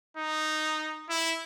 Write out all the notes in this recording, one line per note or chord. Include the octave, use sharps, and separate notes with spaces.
D#4
E4